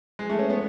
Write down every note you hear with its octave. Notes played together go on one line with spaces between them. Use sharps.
G#3
A3
C#4
B3